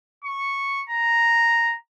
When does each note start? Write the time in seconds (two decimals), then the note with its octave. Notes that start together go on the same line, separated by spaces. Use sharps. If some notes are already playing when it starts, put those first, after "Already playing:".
0.24 C#6
0.89 A#5